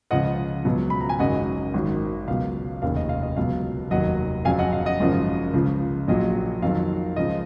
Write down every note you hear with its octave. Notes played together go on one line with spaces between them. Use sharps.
C#2 C#3 F3 D#5 F#5
C#2 B2 F#3
B5
A#5
G#5
G#1 F#2 C#3 F#3 D#5 F#5
G#1 F#2 D#3 F#3
C#2 B2 F#3 F5
F1 D#2 C#3 F5
D#5
F5
D#5
C#2 B2 F#3 F5
F1 D#2 D#3 F#3 D#5 F#5
F2 C#3 F#3 F5 G#5
D#5 F#5
F5
D#5 F#5
G#1 F#2 C#3 F3
C#2 C#3 F3
A#1 A#2 F#3 D#5
F2 D#3 F#3 F5
C#2 C#3 F3 D#5